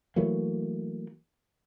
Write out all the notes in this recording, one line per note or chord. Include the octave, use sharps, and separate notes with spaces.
E3 F#3 A3 A#3